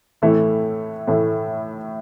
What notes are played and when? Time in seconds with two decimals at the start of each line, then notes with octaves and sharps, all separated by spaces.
0.22 A2 E3 A3 E4
1.08 A2 E3 A3 E4